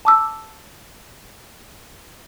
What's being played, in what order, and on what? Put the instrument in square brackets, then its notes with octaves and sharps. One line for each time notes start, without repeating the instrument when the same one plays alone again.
[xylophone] A5 D6 E6